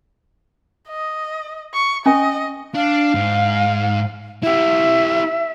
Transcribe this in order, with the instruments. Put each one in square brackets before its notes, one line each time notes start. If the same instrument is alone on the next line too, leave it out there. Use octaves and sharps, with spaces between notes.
[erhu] D#5
C#6
[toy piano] C#4 G#5 [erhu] D#5
[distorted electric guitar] D4 [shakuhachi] F5
[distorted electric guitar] G#2
[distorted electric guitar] E4 G4 [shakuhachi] E5